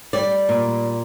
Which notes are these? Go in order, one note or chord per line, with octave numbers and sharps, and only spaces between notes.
G3 D5
A#2